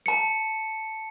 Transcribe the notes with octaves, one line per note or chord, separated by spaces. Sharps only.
A5 C#7